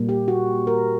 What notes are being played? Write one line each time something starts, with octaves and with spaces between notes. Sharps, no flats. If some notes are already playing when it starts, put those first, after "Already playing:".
Already playing: A#2 G3 A#3
G4
F#4
A#4